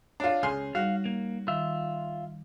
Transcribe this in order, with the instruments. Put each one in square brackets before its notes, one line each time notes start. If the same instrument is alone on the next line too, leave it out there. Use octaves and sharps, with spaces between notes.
[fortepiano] D4 F4 [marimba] C#5
[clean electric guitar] C#2 [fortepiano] G#4 C6 F6
[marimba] G3 D#4 [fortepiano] F#4 [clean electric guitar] F5
[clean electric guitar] A#3
[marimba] D#3 [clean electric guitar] F4 E5